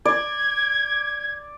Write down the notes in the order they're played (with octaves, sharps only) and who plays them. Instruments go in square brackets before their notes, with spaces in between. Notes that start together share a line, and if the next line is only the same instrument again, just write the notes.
[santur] D5 [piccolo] G#6